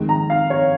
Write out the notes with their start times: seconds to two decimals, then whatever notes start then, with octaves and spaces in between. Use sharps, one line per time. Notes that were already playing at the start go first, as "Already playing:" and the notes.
Already playing: F2 D#3 G#3
0.09 A#5
0.30 F5
0.50 C#5